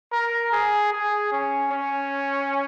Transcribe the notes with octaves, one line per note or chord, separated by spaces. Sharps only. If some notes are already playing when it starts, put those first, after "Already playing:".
A#4
G#4
G#4
C#4
C#4